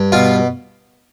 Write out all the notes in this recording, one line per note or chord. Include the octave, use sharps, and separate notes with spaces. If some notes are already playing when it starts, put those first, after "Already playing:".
Already playing: G2
B2 F4